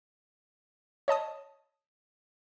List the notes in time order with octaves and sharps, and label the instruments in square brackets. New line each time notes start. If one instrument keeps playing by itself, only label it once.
[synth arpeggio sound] C#5 D#5 A5 D#6